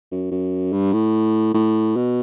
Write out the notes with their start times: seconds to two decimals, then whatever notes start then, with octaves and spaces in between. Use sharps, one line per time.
0.11 F#2
0.31 F#2
0.73 G2
0.93 A2
1.54 A2
1.96 B2